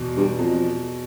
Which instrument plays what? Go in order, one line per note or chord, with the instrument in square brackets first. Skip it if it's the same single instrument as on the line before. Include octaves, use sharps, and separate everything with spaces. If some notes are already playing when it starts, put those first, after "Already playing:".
Already playing: [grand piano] E2 B2
[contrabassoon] G2
[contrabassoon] F2 [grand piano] B2